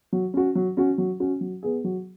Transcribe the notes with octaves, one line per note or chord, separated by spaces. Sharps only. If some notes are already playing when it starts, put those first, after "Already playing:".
F#3
C#4 F#4
F#3
C#4 F#4
F#3
C#4 F#4
F#3
B3 G#4
F#3